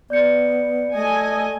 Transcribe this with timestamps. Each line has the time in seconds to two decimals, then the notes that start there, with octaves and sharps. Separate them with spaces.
0.10 B3 D5 G6 C#7
0.94 A3 D#5 G#5